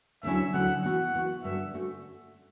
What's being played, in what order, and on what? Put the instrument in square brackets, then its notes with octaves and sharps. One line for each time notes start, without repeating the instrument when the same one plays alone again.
[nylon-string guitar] D2 D3 F#3 C#4 E4 [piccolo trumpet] E5
[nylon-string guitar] D2 D3 F#3 C#4 E4 [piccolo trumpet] F#5
[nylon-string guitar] E3 B3 F#4 [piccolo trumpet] F#5
[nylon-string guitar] E3 B3 F#4
[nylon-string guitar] G2 D3 A3 C#4 F#4 [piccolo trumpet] E5
[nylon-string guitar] D3 A3 C#4 F#4